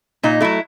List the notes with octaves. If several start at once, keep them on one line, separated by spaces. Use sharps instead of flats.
A#2 D#4
F#3 A3 E4